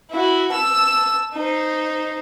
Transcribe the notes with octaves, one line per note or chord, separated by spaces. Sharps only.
E4 F#4
A5 E6
D#4 C5